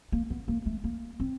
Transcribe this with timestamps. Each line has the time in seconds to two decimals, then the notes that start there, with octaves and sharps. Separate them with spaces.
0.12 A#3
0.30 B3
0.48 A#3
0.66 A3
0.84 A#3
1.20 C4